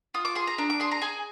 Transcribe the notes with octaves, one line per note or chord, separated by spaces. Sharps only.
F4 D#6
D6
G#4 C6
A#5
D4 A#5
D6
G#4 C6
A#5
G#4 G#5